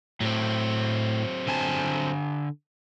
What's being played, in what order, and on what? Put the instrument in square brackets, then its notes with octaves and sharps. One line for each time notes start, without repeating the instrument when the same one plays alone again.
[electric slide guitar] A2 [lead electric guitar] F#3 C4
[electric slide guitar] D3 G#5 A5